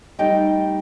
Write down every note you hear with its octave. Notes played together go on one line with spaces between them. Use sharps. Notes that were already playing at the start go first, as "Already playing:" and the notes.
G3 A3 D#4 G4 D#5 G5